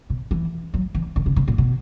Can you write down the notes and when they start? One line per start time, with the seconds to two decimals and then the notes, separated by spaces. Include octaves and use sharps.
0.10 B2
0.31 E3
0.74 F#3
0.95 E3
1.16 D#3
1.26 C#3
1.36 B2
1.48 A#2
1.58 B2